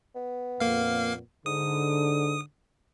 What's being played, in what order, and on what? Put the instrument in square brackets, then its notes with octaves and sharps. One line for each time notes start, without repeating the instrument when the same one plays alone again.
[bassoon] B3
[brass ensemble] F2 A#2 [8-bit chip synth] A#3 F5
[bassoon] G#2 [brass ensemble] D3 [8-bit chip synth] D#6